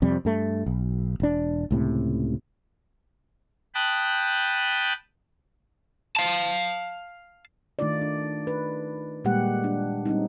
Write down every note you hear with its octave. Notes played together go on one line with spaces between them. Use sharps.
F2 C3 G3
G2 A3
B1
E1 D4
C#2 A2 C3
G5 A5 B5 D#6 F#6 G6
F5 A5
D#3 A3 D4 D#4 F4 D5
D4
B4
A#2 G3 G#3 A#3 G4 F#5
D4
G3 C4 C#4 D#4